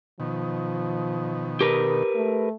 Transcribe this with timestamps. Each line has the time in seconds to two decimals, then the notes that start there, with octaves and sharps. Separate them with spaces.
0.20 B2 D#3 F3
1.61 G4 A#4 B4
2.15 A3